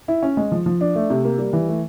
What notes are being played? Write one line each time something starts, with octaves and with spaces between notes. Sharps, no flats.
E4
C#4
G#3
F3
F3
D4
A3
C3
A#3
G3
E3
A3